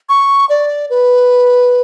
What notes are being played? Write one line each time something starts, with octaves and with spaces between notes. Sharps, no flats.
C#6
D5
B4